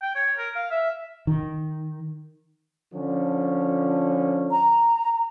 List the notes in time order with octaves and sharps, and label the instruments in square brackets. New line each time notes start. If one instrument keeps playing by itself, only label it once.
[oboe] G5
C#5
A#4
F5
E5
[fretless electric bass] D#3
[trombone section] D3 F3 C#4
[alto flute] A#5